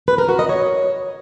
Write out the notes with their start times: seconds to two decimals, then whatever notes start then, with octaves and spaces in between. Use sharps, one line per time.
0.08 B4
0.18 A#4
0.29 F#4
0.39 D#5
0.49 C#5